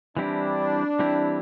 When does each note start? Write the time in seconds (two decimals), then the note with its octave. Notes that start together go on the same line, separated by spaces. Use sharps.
0.17 E3 G3 C4 D4 E4 G4
0.99 E3 G3 C4 E4 G4